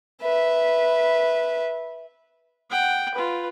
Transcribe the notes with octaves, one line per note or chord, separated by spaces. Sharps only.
B4 E5
F#5 G5
F4 B4